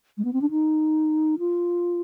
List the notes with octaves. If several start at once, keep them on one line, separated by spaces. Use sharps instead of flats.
G#3
B3
C4
D4
D#4
F4